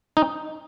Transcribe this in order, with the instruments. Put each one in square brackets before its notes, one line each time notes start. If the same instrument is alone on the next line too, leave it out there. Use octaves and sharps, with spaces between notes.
[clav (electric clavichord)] D#4